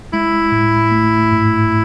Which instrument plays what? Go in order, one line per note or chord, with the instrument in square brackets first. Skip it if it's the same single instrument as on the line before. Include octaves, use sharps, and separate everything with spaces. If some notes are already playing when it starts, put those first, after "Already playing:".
[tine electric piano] G#3 [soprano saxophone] E4
[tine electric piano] A2
A3
G#2